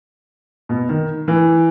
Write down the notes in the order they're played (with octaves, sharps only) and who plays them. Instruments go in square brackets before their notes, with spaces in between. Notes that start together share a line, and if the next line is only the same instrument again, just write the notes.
[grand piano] B2
D#3
E3